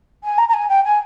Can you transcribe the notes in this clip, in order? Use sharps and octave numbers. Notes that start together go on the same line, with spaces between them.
G#5
A#5
A#5
G#5
G5
G#5